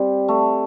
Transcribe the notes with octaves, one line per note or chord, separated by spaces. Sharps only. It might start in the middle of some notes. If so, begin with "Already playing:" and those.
Already playing: G3 C4
A3